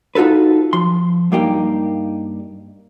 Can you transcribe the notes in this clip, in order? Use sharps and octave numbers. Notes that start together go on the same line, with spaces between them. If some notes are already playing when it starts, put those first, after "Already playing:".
D#4 F4 F#4 A4 B4
F3 C6
G2 G3 A#3 D#4 G4